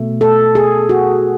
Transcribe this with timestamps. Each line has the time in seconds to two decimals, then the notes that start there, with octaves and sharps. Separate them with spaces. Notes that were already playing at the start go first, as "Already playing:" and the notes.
Already playing: B2 A3
0.21 A4
0.55 G#4
0.89 F#4